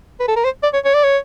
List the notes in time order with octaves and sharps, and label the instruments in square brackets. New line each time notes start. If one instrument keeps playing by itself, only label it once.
[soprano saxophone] B4
A4
A#4
C5
D5
C#5
C#5
D5
C#5